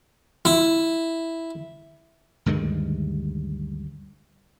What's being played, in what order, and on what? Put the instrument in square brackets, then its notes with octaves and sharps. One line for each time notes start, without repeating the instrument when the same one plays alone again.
[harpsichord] E4
[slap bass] D2 G2 D#3 G#3